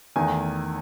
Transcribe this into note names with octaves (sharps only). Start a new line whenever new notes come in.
E2 D#3 A3 G#5